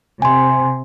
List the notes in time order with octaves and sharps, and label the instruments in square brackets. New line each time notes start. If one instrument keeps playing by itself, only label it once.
[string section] C3 [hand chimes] G#5 C6